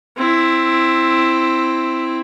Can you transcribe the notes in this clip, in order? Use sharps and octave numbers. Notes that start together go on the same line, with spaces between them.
C4 E4